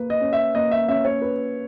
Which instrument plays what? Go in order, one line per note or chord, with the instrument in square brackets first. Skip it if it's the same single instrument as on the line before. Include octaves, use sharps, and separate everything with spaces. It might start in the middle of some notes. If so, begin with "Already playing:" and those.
Already playing: [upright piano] A#3 B4
[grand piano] D#5
[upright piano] C#4
[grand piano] E5
[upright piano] A#3 [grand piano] D#5
[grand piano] E5
[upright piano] C#4 [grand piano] E5
[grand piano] C#5
[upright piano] B4